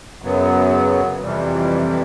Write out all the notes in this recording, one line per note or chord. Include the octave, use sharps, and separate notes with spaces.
F#2 C#3 F#3 B3
F2 C3 E3 G3